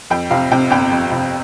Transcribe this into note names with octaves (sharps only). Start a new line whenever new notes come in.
F2 G5
C3 F5
C3 G5
G1 G5
F2
C3